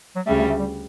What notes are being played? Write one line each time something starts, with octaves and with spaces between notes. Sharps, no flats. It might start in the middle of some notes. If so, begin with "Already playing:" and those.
F#3
D2 C#3 G3 A3
A3
A3
G3